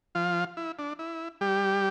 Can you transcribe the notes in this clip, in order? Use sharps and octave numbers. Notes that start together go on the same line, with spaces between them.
F3 F4
E4
D4
E4
G3 G4